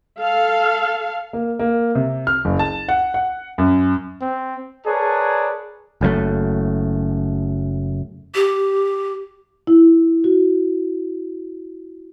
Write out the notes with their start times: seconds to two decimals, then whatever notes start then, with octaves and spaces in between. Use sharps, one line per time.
0.20 A4 F5
1.33 A#3
1.59 A#3
1.95 C3
2.27 F6
2.45 F#1
2.59 A5
2.89 F#5
3.14 F#5
3.58 F#2
4.21 C4
4.86 G#4 A#4 B4 C#5 D5 A5
6.01 F#1 F#2 C#3 A3
8.35 G4
9.67 E4
10.24 F#4